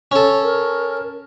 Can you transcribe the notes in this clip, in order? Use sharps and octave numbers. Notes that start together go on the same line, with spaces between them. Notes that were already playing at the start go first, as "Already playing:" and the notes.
C#4 A4
A#4